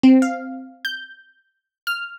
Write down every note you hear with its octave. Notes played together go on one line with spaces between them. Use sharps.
C4
F5
G6
F6